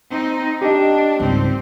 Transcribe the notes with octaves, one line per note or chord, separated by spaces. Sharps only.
C4 D#4
D4 G4 D#5
G#1 C#2 G3 C4